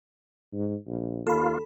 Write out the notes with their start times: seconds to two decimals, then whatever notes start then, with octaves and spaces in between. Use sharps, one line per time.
0.53 G#2
0.87 A#1
1.27 D#2 A#3 F4 A4 B5